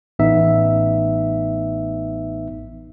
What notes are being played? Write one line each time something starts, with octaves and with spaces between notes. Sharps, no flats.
A1 B3 D#4 E5